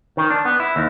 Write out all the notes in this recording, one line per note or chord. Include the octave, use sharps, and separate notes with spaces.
D#3
D4
B3
E4
D#2